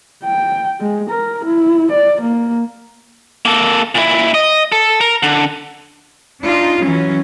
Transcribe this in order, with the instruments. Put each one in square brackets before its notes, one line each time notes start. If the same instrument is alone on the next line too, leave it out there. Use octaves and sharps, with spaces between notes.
[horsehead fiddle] G5
G#3
A#4
E4
D5
A#3
[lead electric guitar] A#3 A4
A#2 E4
D#5
A4
A#4
D3
[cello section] D4 D#4 F4
E3 F#3 C#4